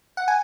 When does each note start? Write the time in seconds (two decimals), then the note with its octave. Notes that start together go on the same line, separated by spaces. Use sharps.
0.17 F#5
0.28 G#5